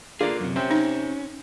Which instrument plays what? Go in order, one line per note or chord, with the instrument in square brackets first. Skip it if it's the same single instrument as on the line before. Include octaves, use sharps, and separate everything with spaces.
[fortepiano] D3 A#3 F4 [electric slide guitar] G#4 D5 F5
[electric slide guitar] F#2 C3
[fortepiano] C3 C5 G5 [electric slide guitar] C#4
[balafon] D#4